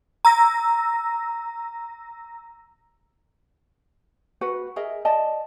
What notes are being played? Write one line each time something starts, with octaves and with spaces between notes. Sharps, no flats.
A#5 E6 A#6
F#4 B4 F#5
G#4 A#4 D#5 E5
D5 D#5 G5 A5